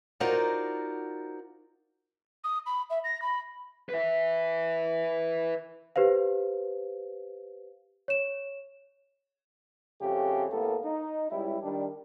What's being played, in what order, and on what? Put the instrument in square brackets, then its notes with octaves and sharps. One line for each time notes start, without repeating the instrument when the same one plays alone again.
[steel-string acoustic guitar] D#4 F4 F#4 A#4 C5 D5
[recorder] D#6
B5
E5
A#6
B5
[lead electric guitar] B4 E5
[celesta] G4 B4 C5 F5
C#5 E7
[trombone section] F2 C#3 A3 G4
A2 A#3 B3 A4
D#4
C#2 G3 E4
D#3 G3 D4